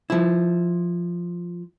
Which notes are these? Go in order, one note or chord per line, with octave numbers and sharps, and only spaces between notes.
F3 E4